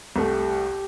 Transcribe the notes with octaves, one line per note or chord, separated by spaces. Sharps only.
C2 A3 G4